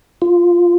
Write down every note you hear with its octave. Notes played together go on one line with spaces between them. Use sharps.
F4